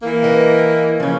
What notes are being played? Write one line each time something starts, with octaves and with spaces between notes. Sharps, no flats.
E3 A#3
B4 D#5 G5
C#3 F3 C#4